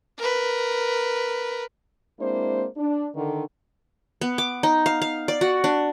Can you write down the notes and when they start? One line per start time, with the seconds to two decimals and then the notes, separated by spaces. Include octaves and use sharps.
0.18 A#4 B4
2.20 G#3 A#3 C4 D4 E4 C5
2.77 D4
3.15 D3 D#3
4.21 B3
4.38 D6
4.63 D#4
4.86 F5
5.02 F5
5.28 D5
5.41 F#4
5.64 D4